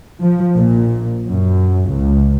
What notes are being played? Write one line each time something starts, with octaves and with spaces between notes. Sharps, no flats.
F3
A#1 A#2
F#2
C#2